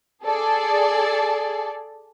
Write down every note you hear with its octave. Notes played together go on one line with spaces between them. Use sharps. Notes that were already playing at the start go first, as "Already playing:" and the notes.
G#4 A4 D5